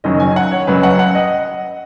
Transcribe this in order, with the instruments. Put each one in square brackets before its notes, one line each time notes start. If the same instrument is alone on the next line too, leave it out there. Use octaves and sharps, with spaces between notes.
[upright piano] F#1 F#2 D#3 F#3 D#5
G#5
F#5
C#5
F#1 F#2 F#3 B4
F#5
F#5
D#5